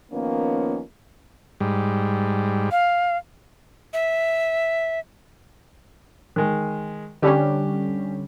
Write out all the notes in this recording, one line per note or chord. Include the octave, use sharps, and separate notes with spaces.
D#3 F3 A#3 B3 C#4
G#2 G3
F5
E5
D#3 G#3
D3 G3 C#4 D4 G4